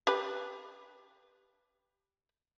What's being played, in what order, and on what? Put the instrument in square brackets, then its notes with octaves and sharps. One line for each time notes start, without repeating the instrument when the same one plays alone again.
[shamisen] G4 B4 B5